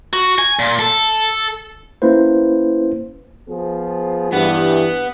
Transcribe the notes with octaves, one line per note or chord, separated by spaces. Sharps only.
F#4
G#5
A#2
A4
A#3 C#4 E4 B4 C5
F3 B3 G#4
G2 E3 B3